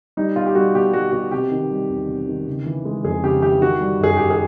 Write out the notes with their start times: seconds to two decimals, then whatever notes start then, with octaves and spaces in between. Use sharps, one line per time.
0.17 G3 D#4
0.36 B2 F4
0.46 G4
0.55 G3 F#4
0.75 B2 G4
0.93 G3 F#4
1.12 B2 F#4
1.32 C3 G4
1.51 D#3
1.70 G3
1.89 E2
2.09 C3
2.28 D#3
2.47 C#3
2.66 E3
2.85 G#3
3.04 F2 G#4
3.23 C#3 G4
3.42 E3 G4
3.61 D#3 F#4
3.81 G3
4.00 F#2 G#4
4.17 F#2 G4
4.31 G#4